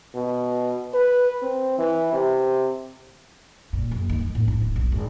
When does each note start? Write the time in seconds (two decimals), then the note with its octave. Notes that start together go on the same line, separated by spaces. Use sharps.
0.15 B2
0.94 B4
1.42 C4
1.79 E3
2.13 C3
3.73 A#2
3.91 F#1
4.09 D#3
4.21 A#3
4.35 A2
4.48 E4
4.61 D1
4.76 B1
4.92 G#1